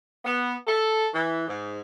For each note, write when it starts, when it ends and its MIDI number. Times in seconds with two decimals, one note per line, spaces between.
0.25 0.54 59
0.67 1.08 69
1.14 1.45 52
1.48 1.81 44